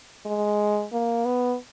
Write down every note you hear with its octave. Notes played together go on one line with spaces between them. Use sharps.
G#3
A#3
B3